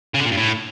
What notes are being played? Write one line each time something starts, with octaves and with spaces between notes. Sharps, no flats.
C#3
D3
A#2
G2
A2